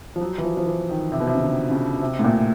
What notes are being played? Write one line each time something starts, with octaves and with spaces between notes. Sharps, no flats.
F3
F#3
E3
F3
F3
E3
D#3
C3
B2
C3
C#3
D3
C#3
C3
A2
A#2